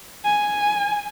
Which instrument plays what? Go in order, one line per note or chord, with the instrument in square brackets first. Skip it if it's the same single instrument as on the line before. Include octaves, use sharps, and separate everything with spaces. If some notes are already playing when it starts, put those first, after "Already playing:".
[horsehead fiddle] G#5